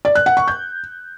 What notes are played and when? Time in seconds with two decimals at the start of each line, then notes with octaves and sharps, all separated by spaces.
0.05 D5
0.15 F#6
0.26 F#5
0.37 C#6
0.48 G6